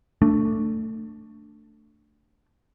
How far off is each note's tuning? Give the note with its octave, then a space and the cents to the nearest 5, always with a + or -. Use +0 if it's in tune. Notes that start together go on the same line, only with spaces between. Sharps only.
A3 +15 D4 +0